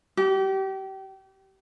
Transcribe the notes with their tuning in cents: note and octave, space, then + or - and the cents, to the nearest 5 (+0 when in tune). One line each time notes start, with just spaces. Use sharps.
G4 -30